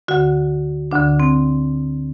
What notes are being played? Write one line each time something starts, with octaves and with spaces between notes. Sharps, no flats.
D2 D3 F#4
D2 D3 D4
C4